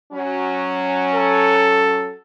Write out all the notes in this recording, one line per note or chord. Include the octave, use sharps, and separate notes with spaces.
F#3 C#4
A4